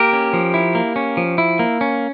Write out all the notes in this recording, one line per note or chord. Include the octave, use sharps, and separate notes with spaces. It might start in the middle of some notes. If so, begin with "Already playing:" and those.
Already playing: A#3 G4 A#4
C#4
F3
E4
A#3
C#4
F3
E4
A#3
C#4